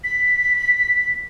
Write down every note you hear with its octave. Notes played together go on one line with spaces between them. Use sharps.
B6